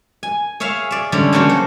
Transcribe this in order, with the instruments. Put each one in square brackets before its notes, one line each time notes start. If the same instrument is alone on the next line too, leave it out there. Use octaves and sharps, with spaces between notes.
[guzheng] G#5
G#4 C#5 E5 F5
D5 E5
D3 G3 G#3 C#4
C#3 F#3 A3 A#3 C#4 F#4
C5